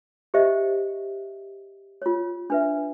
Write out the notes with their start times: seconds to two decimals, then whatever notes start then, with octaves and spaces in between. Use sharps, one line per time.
0.34 G4 C5 D#5 E5
2.02 F4 C#5
2.50 D4 B4 E5